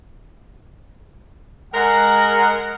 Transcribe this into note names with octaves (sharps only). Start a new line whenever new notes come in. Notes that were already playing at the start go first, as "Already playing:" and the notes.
G#3 A#4 F#5